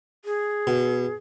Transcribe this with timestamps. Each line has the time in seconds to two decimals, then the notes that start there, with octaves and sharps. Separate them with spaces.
0.25 G#4
0.67 B2